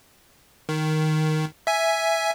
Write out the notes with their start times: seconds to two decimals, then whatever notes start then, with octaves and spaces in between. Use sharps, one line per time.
0.69 D#3
1.67 E5 G#5